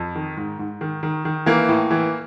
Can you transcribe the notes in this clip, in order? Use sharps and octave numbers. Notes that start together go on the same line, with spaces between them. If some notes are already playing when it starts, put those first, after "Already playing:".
Already playing: F2
D#3
G#2
G#2
D#3
D#3
D#3
E3 A#3
A2
E3